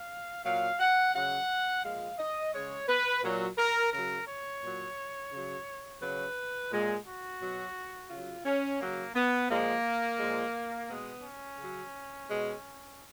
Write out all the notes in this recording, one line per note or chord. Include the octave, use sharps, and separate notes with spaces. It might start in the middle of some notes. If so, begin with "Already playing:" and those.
Already playing: F5
A#2 F#3 F5
F#5
C#3 F#3 F#5
A#2 F3 G#3 F5
D#5
C#3 G#3 C#5
B4
A#2 F#3
A#4
C#3 F#3 A#4
C#5
A#2 F#3
C#3 F#3
C#3 F#3 B4
A#2 G#3
F#4
B2 F#3
C#3 F#3 F4
C#4
C#3 F#3 A#3
B3
A#2 F3 G#3 A#3
A#2 F3 G#3
B2 G#3 B3
C#4
C#3 F#3
B2 G#3